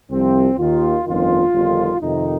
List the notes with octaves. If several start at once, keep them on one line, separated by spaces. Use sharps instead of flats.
C2 C3 F3 C4
D#2 D#3 F4
G1 F2 D#3 F4
G1 F2 D#3
F2 C3 D#3 D#4